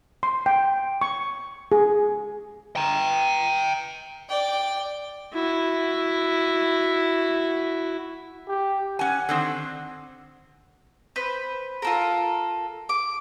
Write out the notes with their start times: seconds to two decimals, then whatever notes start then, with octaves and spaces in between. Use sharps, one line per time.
0.23 C6
0.46 G5
1.01 C#6
1.72 G#4
2.76 G5 A#5
4.29 D5 G5
5.34 E4 F#4
8.48 G4
8.99 C#4 F#5 G#5
9.29 D3 D#3 C4
11.16 B4 C5
11.82 F4 A4 A#4
12.89 D6